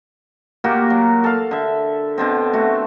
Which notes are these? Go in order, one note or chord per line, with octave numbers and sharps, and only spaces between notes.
A#2 A#3 F#4 G4
F#3
A4 F5
D3 E5
B2 D3 C4
A3 F#4